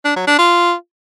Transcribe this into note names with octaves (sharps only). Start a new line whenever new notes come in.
D4
F#3
D4
F4